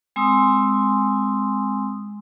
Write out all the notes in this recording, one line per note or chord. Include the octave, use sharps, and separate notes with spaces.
G#3 C4 G#5 C6 D#6 E6